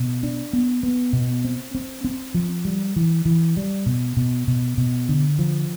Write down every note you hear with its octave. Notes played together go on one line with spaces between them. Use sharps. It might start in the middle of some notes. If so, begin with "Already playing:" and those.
Already playing: B2
D4
B3
B3
B2
C4
C4
C4
F3
G3
E3
E3
G3
B2
B2
B2
B2
D3
F3